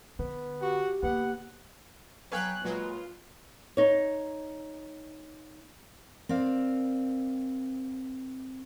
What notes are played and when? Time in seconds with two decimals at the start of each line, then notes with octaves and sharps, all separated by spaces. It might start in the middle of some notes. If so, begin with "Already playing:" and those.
0.19 D3 B3
0.61 F#4 G4
1.03 C#3 A#3 B3 F#5
2.32 F#3 B3 B4 C#5 F5 G5 G#5 F#6
2.64 A#2 F#3 G#3 F4 B4
3.77 D#4 C#5
6.29 C4 A#4 D5 F5